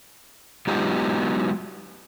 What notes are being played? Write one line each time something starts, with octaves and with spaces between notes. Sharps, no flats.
F#3 G#3 B3 D#4 F4 G4